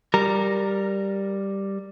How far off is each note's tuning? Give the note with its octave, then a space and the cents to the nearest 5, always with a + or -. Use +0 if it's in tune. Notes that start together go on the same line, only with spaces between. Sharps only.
G3 +0 A#4 +0 A#5 +0